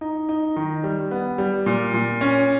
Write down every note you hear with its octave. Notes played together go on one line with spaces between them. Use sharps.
D#4
D#4
D#3
G3
B3
G3
A#2
A#2
C#4